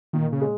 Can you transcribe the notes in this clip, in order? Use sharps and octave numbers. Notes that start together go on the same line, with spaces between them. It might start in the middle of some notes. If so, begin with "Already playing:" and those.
A#2 D#3
C#3
G#3